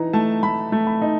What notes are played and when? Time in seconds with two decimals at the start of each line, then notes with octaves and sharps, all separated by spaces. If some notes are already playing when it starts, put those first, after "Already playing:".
Already playing: E3 D#4 A#5
0.13 A3 A5
0.43 A3 B5
0.72 A3
0.87 B5
1.02 D#4